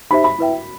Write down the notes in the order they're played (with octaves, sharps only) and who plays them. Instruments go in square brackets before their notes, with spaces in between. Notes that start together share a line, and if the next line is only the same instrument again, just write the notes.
[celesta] D#4 G4 C5 E5 [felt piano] B5
[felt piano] B5
[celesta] E4 B4 E5 G5